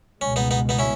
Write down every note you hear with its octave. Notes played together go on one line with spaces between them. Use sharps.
C#2 B2 G#3 C#4
B3 D#4
B3 D#4
B3 D#4
C#4 E4